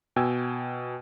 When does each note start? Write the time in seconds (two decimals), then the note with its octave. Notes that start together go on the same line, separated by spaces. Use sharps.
0.16 B2 G5 G#5 E6 G#6